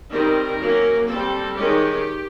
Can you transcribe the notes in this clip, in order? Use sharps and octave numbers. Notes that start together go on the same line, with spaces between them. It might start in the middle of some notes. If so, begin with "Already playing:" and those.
D#3 G3 C4 A#4
F#3 A#3 C#4
G3 C4 A4
D#3 G#3 C#4 G4